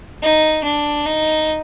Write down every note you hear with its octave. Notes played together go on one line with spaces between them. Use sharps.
D#4
D4
D#4